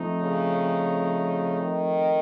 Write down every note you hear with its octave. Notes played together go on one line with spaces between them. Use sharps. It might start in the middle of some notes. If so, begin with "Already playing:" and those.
Already playing: F3 A3 C4 D#4
C#3
D#3